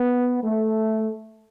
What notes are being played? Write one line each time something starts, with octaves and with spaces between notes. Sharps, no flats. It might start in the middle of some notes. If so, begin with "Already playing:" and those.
Already playing: B3
A3